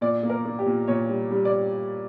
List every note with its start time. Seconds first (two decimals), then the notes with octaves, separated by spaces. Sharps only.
0.01 A#2 D5
0.23 A#3
0.30 A#4
0.45 A#3
0.59 G4
0.66 A#2
0.88 A#2 C#5
1.09 G3
1.31 G3
1.45 D5